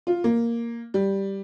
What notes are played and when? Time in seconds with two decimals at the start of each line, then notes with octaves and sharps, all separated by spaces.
0.07 F4
0.24 A#3
0.94 G3